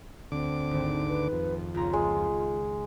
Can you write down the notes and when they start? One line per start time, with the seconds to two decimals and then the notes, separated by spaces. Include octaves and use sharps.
0.32 D2 D3 C4 D6
0.71 G#1
1.08 B4
1.32 F2
1.74 C#2 F4 A#5
1.93 G#3